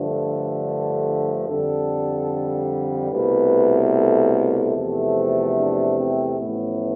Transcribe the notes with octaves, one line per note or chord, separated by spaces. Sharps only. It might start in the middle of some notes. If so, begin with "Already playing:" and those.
Already playing: G2 D3 F3 A3 A4
F2 D3 G3 A4
C2 B2 A3 B4
A4
A4
E2 C3 F3 A3
D4
C4
A1 A2 F3 A3 B3